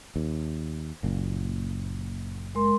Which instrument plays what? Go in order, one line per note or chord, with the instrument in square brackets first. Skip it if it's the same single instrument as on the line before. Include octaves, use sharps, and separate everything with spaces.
[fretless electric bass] D#2
F#1 A#2
[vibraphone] G#3 A#4 C6